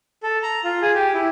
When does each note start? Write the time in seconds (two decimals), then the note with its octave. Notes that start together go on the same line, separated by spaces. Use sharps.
0.23 A4
0.43 A#5
0.64 F4
0.82 G#4
0.94 G4
1.14 E4